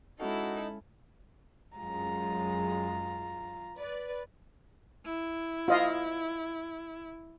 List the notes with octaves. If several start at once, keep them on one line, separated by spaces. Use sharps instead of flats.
G#3 C#4 D#4 E4 F#4 A4 F5
F#2 G#3 F4 A#5
B4 D5
E4
F4 D#5 F5